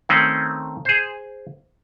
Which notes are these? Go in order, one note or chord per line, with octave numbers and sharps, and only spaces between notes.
D#3 A3 C4 C#4
G#4 C5